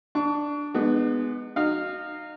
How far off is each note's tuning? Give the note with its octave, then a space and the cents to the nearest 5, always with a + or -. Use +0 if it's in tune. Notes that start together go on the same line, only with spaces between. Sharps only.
D4 +0 C#6 +40
G#3 +0 B3 +0 D4 +45
D#4 -25 F#4 +0 F5 +0